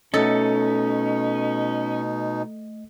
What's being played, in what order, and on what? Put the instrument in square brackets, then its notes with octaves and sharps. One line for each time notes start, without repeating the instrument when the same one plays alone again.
[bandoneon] B2 D#4 [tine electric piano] A3 D#5 [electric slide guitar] C#4 [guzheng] A4